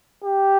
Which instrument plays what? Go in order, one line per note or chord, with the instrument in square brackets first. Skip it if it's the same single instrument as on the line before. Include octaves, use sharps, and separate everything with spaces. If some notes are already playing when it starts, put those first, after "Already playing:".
[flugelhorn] G4